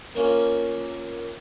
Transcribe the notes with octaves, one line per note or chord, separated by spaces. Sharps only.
A#3 C#4 F4